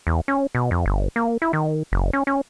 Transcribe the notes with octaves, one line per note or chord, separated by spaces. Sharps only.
E2
C#4
B2
F2
G1
A#3
E4
D#3
F#1
C#4
C#4